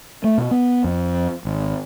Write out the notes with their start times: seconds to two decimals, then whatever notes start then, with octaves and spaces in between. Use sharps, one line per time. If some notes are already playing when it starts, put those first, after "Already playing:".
0.24 A3
0.38 B2
0.51 B3
0.84 F2
1.45 G#1